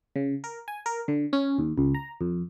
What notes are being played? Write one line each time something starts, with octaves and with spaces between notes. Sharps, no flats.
C#3
A#4
G#5
A#4
D3
C#4
D#2
C#2
A#5
F2